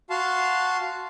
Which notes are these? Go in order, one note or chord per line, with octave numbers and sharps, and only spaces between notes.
F#4 F5 A5 C6